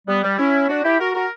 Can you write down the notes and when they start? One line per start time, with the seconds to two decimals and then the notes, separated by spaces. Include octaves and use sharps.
0.07 G3 B3
0.23 G3
0.38 C#4 E4
0.68 D4 F#4
0.84 E4 G4
0.99 F#4 A#4
1.14 F#4 A#4